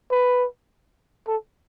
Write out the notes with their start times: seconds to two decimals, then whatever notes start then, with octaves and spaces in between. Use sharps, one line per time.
0.11 B4
1.27 A4